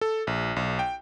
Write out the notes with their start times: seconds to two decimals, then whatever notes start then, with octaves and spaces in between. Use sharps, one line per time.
0.01 A4
0.27 A#1
0.56 B1
0.79 G5